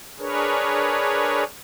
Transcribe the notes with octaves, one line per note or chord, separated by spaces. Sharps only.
D4 G#4 A#4 B4 C#5